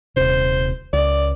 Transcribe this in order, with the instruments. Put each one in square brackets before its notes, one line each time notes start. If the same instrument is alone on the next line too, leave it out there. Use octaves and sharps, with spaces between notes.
[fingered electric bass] D#1 C3 [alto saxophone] C5
[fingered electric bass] C#2 [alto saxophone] D5